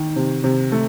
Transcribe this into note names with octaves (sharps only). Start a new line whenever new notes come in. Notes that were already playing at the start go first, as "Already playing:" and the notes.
Already playing: D#3
C3
C3
A3